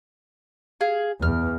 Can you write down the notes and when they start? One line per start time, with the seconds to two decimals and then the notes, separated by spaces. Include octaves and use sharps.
0.81 G#4 F5
1.22 E2 F6